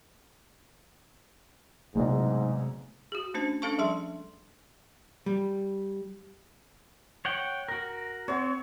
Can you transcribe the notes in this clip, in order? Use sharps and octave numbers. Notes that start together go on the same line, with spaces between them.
B1 E2 G#2 C3 G#3 A3
F#4 G#4
A3 C#4 D4 C5 A5
C#4 D4 A4 F5 A5 C#6
F3 G3 G#4 E5 A5 C6
G3
C#5 F#5 G5
F#4 A#4
C4 C#5 F#5